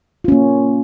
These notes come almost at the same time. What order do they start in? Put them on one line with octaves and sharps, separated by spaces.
F4 C#4 A#3